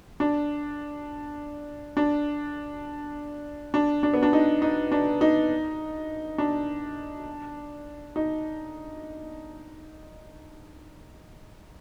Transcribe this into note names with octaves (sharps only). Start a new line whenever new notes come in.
D4
D4
D4
D4
B3
D4
D#4
D#4
D4
D#4
D4
D#4